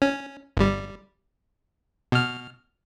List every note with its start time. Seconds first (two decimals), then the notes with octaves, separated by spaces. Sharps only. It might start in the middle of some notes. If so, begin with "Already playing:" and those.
0.02 C#4
0.57 G1 G3
2.12 B2 F6